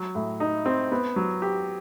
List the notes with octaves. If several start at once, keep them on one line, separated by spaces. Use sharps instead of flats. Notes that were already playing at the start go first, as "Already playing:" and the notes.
Already playing: F#3
A2
D#4
C4
B3
F#3
G4